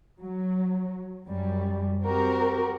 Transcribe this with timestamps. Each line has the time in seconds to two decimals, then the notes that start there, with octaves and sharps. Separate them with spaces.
0.21 F#3
1.28 F#2 G3
2.02 C4 F#4 G4 A#4